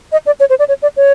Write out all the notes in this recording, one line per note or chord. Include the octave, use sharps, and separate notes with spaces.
D#5
D5
C#5
C5
D5
C#5
D5
C#5